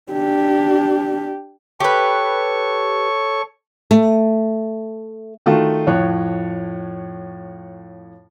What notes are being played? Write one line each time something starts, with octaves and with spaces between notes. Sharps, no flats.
D4 G4
G4 A4 B4 C#5 C#6
A3
D#3 A3 F4 F#4
F2 A2 C#5 F#6